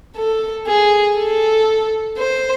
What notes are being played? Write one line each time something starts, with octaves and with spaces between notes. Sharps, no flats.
A4
G#4
A4
C5